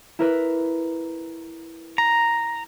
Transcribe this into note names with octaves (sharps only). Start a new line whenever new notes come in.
E4 A#4 B4
A#5